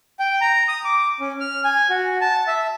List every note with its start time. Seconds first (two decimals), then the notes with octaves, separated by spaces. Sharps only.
0.19 G5
0.41 A#5
0.68 D#6
0.84 D6
1.20 C#4
1.40 F6
1.64 G#5
1.90 F#4
2.21 A5
2.47 E5